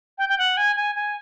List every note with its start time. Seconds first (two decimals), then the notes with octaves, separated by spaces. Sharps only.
0.18 G5
0.29 G5
0.39 F#5
0.57 G#5
0.76 G#5
0.95 G#5